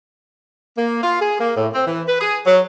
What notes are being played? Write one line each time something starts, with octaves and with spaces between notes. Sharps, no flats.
A#3
F4
G#4
A#3
A2
C4
E3
B4
G#4
F#3